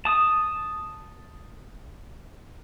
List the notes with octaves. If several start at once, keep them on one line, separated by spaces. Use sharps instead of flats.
A5 D#6